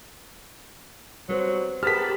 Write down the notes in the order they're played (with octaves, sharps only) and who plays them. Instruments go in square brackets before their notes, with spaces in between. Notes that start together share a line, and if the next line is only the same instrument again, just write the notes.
[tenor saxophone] F#3 [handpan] G3 B4 C5
[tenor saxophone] B3 [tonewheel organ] G4 A5 B5 [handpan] G#4 A#4 [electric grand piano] F6 B6